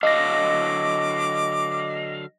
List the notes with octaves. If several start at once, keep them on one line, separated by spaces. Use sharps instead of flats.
D3 F#3 D#5 F5 D6 A#6